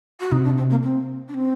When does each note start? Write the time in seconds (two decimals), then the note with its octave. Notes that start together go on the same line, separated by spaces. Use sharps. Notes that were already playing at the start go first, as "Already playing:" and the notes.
0.20 F#4
0.32 C3 D#4
0.44 D4
0.58 C4
0.70 A#3
0.83 C4
1.28 D4
1.34 C4